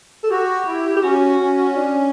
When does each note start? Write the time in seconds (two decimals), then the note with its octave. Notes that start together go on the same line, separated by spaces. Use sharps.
0.23 A4
0.31 F#4 G4
0.66 E4
0.97 G4
1.03 C#4 F#4
1.39 C#4
1.76 D4